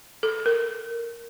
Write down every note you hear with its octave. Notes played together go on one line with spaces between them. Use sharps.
A4
A#4